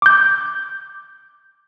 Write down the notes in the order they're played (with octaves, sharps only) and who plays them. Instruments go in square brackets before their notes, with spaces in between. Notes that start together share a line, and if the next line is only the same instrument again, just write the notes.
[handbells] D6 G6